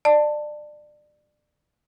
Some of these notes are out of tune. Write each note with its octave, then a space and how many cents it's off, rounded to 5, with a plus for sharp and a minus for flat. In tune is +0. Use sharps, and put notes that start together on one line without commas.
D5 +25 A5 +15